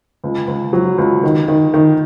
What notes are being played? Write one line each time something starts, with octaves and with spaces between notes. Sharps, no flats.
C#2
C#2
F#3
C#2
D#3
D#3
D#3